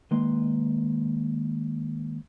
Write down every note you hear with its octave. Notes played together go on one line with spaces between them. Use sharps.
D#3 G#3 A#3 B4 C6